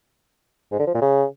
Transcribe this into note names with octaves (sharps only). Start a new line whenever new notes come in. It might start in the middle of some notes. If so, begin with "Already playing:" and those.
G#2
D3
F3
A#2
C#3